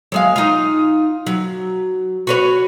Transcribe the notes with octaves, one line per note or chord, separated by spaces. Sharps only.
F#3 G#3 F5
D#4 F4
F#3
F#4 B4 C#5